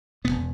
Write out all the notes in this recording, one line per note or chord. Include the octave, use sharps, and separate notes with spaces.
E1 E2 C#3 B3